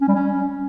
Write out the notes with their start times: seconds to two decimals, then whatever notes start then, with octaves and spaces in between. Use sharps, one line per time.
0.01 C#4
0.08 G3
0.15 C#4